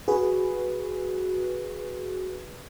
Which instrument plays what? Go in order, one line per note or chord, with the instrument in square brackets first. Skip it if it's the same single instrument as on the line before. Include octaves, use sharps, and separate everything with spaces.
[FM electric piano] F#4 G#4 B4